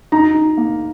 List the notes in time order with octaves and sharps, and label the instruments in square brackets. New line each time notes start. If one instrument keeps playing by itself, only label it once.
[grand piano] D#4 A#5
D#4
A#3